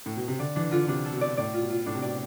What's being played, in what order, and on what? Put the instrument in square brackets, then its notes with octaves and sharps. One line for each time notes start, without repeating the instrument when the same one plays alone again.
[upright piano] A2
B2
C3
[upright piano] D3 [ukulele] D5
[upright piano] E3 [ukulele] D4
[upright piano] D3 [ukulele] F4
[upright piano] C3 [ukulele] D4
[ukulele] A4
[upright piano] B2
[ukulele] D5
[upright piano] A2 [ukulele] D5
[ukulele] F4
[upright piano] B2
[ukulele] F4
[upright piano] A2 [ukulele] D4
[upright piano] C3
[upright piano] B2 [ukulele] D5